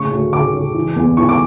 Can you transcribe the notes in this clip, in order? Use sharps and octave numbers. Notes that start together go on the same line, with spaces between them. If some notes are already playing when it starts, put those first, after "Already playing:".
Already playing: A2 C#3 C#6
D2
C#3 D6
C#3
E3
E2
E3 C#6
D6